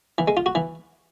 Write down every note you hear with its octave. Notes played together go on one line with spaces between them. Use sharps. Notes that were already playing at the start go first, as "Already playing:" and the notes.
E3
G#3
F4
F#4
E3